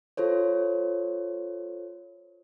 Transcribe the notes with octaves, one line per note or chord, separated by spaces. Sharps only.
F4 A4 C5 C#5